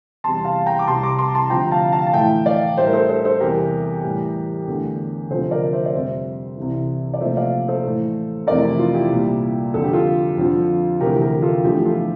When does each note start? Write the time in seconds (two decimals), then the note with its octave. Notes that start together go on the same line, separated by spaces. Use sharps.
0.24 E2 C3 G3 A5 C6
0.45 F5 A5
0.66 G5 A#5
0.79 D6
0.87 C2 C3 G3 A5 C6
1.03 A#5 D6
1.19 A5 C6
1.35 A5 C6
1.50 D2 C3 F3 G5 A#5
1.71 F5 A5
1.92 F5 A5
2.07 A5
2.13 A2 E3 A3 E5 G5
2.46 D5 F5
2.77 A2 G3 C5 E5
2.86 A#4
2.93 A4 C5
3.09 A4 C5
3.25 A4 C5
3.40 E2 C3 G3 G4 A#4
4.04 A2 E3 G3
4.67 E2 D3 A3
5.30 D2 C3 F3 A3 A4 C5
5.51 A#4 D5
5.73 C5 E5
5.85 D5
5.93 F2 C3 G3 C5 E5
6.57 C2 C3 E3
7.14 D5
7.20 C2 A#2 F3 A3 C5 E5
7.32 E5
7.37 D5 F5
7.68 A4 C5
7.84 A2 E3 A3
8.47 F2 C3 E3 A3 A#4 D5
8.63 E4
8.79 F4
8.94 E4 G4
9.11 C2 A#2 G3
9.74 F2 D3 G3 A4
9.84 G4
9.93 F4 A4
10.38 F2 D3 F3
11.00 D2 C3 E3 A3 G4 A#4
11.22 G4 A#4
11.42 F4 A4
11.64 E2 D3 F3 A3 E4 G4
11.85 F4 A4